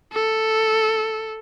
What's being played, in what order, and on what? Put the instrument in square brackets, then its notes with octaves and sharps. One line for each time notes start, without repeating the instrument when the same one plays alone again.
[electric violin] A4